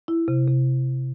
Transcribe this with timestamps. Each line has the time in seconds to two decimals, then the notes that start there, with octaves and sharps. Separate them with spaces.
0.08 E4
0.28 C3
0.48 C3